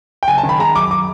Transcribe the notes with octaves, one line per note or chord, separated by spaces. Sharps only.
G5
F#1 G#5
A5
D#3
B5
G#3 A#5
F#2 D6
D6